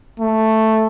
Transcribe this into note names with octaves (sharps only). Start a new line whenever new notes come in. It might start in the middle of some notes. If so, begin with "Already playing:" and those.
A3